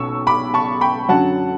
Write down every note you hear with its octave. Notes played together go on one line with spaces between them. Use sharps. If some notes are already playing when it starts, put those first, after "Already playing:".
Already playing: B1 B2 C#4 C#6 E6
B5 D6
A5 C#6
G5 B5
F#2 D3 F#3 F#5 A5